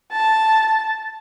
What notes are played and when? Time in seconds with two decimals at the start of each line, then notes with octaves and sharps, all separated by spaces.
0.12 A5